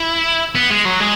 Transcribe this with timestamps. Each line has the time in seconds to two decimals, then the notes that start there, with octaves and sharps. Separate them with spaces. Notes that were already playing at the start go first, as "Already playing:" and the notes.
Already playing: E4
0.55 B3
0.71 G#3
0.85 F#3
1.00 G#3